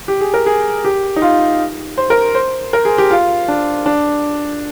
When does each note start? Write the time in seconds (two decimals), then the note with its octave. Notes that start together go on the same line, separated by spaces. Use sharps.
0.08 G4
0.21 G#4
0.34 A#4
0.46 G#4
0.85 G4
1.16 D#4
1.22 F4
1.98 C5
2.10 A#4
2.35 C5
2.73 A#4
2.85 G#4
2.98 G4
3.11 F4
3.48 D4
3.86 D4